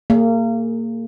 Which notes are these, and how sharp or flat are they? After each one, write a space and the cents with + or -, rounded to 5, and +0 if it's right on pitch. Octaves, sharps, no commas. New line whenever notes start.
A#3 -30 G#4 +0